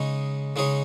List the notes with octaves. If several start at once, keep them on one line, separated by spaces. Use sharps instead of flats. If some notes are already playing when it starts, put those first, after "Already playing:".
Already playing: C#3 G#3 D#4 G#4 C#5
C#3 G#3 D#4 G#4 C#5